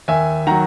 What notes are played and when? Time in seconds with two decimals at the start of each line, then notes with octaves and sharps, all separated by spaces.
0.08 D#2 E5 G#5
0.47 D#3 F#3 F#5 A#5